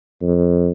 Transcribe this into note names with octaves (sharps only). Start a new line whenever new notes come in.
F2